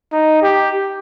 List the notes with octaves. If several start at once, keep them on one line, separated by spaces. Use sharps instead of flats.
D#4
G4